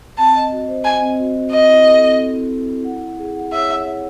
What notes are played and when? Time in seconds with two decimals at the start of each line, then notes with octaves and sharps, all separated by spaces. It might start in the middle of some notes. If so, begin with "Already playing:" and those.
0.18 C4 A5
0.35 D#5
0.52 F#4
0.68 C5
0.84 D#5 G#5
1.01 C4
1.18 F#4
1.34 F#4
1.51 C4 D#5
1.68 E4
1.85 A4
2.02 C4
2.18 A4
2.34 E4
2.51 E4
2.68 E4
2.84 F#5
3.01 E4
3.18 G#4
3.34 F#5
3.52 C#5 E5
3.68 F#5
3.84 F#5